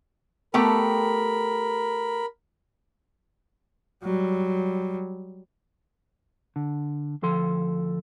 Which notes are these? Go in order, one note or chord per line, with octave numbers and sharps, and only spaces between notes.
A3 B3 G4 A#4 B5
F#3 G3
D3
D2 F3 A4 C6